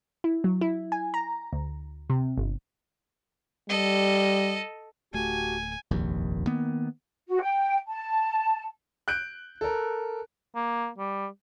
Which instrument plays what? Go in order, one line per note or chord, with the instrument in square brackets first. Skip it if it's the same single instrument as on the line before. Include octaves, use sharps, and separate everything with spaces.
[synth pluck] E4
F#3
E4
G#5
A#5
D2
C3
G1
[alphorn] G3 [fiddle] A4 D#5
[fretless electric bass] D1 A3 [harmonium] F#4 G4 A5 [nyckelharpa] G#5
[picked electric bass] F1 A#1 D#2
D#3 A#3 B3
[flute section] F#4
G5
A5
[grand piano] F#6 G6 D7
A4 A#4
[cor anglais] A#3
G3